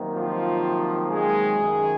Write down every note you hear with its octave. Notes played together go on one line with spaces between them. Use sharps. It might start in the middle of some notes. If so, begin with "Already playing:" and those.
Already playing: C3 D#3 F#3 A#3
F3 F4
G#3 G#4
F#2 D#3 G#3